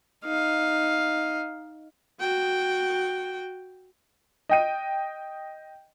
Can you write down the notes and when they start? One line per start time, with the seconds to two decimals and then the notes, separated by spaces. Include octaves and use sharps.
0.24 D#4 F5
2.20 F#4 G5
4.49 D#5 G5 D#7